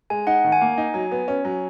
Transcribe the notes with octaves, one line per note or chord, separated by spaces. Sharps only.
G#3 G#5
D#4 F#5
D#3
G#5
A#3
D#4
F#3
B3
C#4
F#3